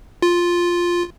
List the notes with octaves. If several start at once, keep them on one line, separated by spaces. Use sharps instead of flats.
F4